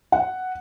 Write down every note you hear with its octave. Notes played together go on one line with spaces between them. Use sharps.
F#5